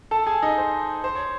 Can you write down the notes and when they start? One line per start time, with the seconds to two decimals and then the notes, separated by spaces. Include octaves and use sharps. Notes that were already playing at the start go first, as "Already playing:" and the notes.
0.11 A4 A5
0.27 G#4 G#5
0.42 D#4 D#5
0.58 C5
1.04 C5
1.15 C#5